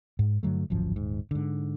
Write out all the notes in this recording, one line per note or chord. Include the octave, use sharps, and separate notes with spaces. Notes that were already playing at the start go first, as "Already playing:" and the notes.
G#2
G2 D3 F#3 A3
D1 G#1 F#2 F3
D#1 G#2
G#2 D3